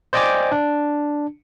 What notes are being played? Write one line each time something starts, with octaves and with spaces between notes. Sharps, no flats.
C5 D5 D#5 G5 G#5 D6
D4